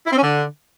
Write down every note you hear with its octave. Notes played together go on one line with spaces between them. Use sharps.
E4
C4
C#4
D3